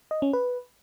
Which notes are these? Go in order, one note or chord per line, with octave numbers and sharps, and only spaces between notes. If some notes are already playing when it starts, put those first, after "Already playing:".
D#5
C#4
B4